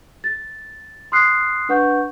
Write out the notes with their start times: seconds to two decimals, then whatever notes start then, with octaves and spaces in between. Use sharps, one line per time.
0.24 A6
1.12 C6 D#6 F6 F#6 C7
1.69 D4 B4 F#5 C#6 G6